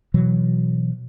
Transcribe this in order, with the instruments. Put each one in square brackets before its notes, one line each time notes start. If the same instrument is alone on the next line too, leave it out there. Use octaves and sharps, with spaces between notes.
[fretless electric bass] B2 E3 F#3